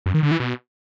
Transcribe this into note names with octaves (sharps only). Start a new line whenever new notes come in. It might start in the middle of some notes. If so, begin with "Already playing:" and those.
F#2
D#3
D3
E3
B2